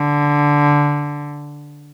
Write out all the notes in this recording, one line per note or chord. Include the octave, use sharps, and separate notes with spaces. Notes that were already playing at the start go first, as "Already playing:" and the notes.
Already playing: D3